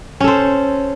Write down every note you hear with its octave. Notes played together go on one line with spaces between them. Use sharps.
C#4 A4 C5